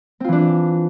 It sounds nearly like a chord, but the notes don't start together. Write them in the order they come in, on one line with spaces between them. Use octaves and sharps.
C4 F4 E3 D4